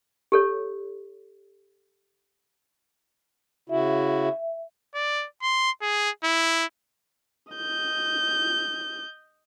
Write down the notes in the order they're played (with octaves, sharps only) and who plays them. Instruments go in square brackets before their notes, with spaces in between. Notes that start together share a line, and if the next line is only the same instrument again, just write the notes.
[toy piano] G4 A4 C#5
[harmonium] C#3 E4 F#4 [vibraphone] E5
[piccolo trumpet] D5
C6
G#4
E4
[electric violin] D#5 G6